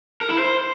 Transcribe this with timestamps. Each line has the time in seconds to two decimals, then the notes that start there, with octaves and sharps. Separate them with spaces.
0.21 A#4
0.30 E4
0.38 C5